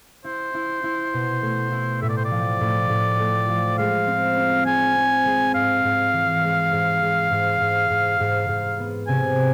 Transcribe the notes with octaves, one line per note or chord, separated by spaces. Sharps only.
E4 C5
E4
E4
B2
A3
E4
A2 E5
D5
C5
D5
F3
A2
A2
A3
F3
G#3 F5
C4
C4
G#3 G#5
C4
G#3
G#2 F5
G#2
E3
G#3
G#2
G#3
G#2
G#2
G#2
G#2
G#2
B3
C3 G#5